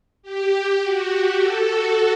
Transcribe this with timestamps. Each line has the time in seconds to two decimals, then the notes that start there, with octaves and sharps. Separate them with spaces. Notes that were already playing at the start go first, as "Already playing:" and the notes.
0.23 G4
0.81 F#4
1.09 G4
1.38 A4
1.67 F#4